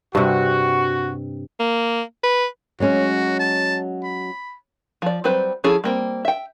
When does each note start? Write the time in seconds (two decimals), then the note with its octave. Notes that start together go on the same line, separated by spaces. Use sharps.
0.15 G2 C3 F#4
1.60 A#3
2.23 B4
2.80 F#3 G#3 C#4 F#4
3.39 A5
4.04 B5
5.02 F3 D5
5.24 F#3 G3 C4 B4 C5
5.64 F3 C#4 E4 G#4 A4
5.84 G3 A#3 C4
6.25 E5 G5